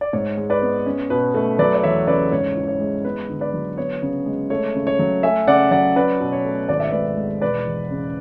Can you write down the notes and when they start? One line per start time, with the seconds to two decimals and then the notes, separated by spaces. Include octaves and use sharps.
0.01 D5
0.13 G#2 C#5
0.37 G#3
0.50 B4 D5
0.62 B3
0.86 C#4
1.10 B2 B4
1.35 A3
1.59 F#3 B4 D5
1.75 D5
1.83 E2 C#5 E5
2.07 C#3 B4 D5
2.32 G#2 C#5
2.56 E3
2.68 C#5
2.80 G#3
3.05 B3 B4
3.29 D3
3.41 B4 D5
3.54 F#3
3.78 B3 C#5
4.02 C#3
4.26 G#3
4.50 A3 C#5
4.75 C#3
4.87 C#5
4.99 F#3
5.23 A3 E5 G#5
5.47 C#3 D5 F#5
5.71 F#3 D5 F#5
5.96 C#4 B4 D5
6.20 B2
6.32 C#5
6.45 A3
6.69 G#1 D5
6.80 E5
6.91 G#2 B4 D5
7.17 G#3
7.42 E1 B4 D5
7.66 E2
7.91 C#3